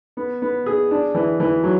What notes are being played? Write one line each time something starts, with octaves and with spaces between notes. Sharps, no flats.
B3
B3
G#4
D4
E3
E3
F#3